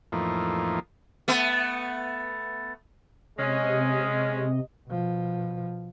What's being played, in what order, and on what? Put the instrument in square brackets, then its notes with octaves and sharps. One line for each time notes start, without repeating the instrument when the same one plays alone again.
[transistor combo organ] F2 A2 E3 F3 A#3 D#4
[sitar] A3 B3
[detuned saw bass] C3 [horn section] G#3 C#4 [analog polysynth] D#5
[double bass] B2 F3